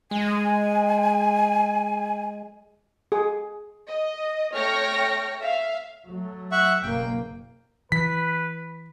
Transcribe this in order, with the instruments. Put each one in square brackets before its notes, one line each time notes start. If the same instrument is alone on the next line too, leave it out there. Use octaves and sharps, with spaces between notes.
[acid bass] G#3 [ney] G#5
[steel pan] G#4
[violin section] D#5
A3 C#5 G5 C#6 F6 A#6
E5 F5
[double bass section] F#3 A3
[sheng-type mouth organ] E5 F#5 C#6
[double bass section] F#1 B2 A#3 [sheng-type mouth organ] G5
[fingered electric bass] E3 [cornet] B4 [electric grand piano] B6